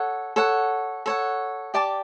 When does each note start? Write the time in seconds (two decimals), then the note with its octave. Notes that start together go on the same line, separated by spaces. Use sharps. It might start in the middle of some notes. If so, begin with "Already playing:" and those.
Already playing: A4 C#5 F#5
0.36 A4 C#5 F#5
1.06 A4 C#5 F#5
1.74 G4 D5 A5 D6